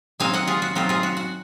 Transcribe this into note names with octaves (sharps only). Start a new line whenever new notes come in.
F#3 C4 D#4 F5 G#5
D#5 F#5
F4 G#4
F#4
F#3 C4 D#4 F4
F4 G#4
F#4
F#4